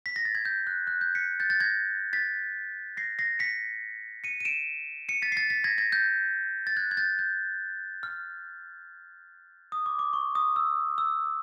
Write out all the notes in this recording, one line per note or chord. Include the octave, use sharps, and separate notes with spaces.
B6
A#6
A6
G#6
G6
F#6
F#6
G6
B6 C#7
G6 A6
G6 A6
G#6 A#6
A6 B6
A#6 C7
A#6 C7
B6 C#7
C#7 D#7
D#7
D7 E7
C#7 D#7
A6 B6
C7
A6 B6
A6 B6
G#6 A#6
G#6 A#6
G6 A6
A6
F#6 G#6
G#6
G6 A6
G6
F6
D#6
D6
D6
C#6
D#6
E6
E6